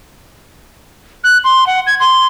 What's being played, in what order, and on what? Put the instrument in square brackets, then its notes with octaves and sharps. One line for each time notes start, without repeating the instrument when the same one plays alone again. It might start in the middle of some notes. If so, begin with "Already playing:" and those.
[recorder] F#6
C6
F#5
G#6
C6